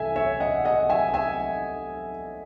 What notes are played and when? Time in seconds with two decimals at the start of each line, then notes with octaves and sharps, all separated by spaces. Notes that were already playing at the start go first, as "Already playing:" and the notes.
Already playing: C2 E3 A4 E5 G#5
0.16 C#5 E5
0.40 D#5 F#5
0.65 D#5 F#5
0.90 E5 G#5
1.14 E5 G#5